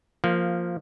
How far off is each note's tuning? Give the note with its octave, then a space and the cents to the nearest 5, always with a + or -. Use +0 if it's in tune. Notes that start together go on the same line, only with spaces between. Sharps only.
F3 +0 A#3 -10